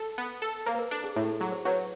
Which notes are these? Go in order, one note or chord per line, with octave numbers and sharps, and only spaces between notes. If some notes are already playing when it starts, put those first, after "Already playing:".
Already playing: A4
B3
A4
A#3 C5
B4
A#4
D4 A4
G#4
A2 E4
A4
F#3 G#4
C5
F#3 B4 C#5